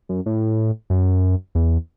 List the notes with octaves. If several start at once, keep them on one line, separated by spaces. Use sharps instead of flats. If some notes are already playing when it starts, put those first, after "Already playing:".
F#2
A2
F#2
E2